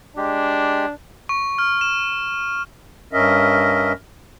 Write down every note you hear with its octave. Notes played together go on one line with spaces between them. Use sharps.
G#3 D4 G4
C#6
F6
E7
G2 C#4 A#4 D#5 E5